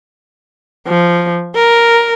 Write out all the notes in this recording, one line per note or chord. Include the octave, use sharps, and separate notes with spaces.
F3
A#4